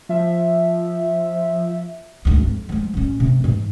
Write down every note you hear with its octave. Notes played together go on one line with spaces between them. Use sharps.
F3 E5
G#1 D2
F2
F3 G#3
A1 C#4
C3
G#2 E3